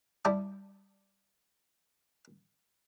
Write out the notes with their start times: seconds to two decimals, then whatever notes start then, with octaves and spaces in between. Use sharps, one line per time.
0.25 G3 E4 D5 A5 D#6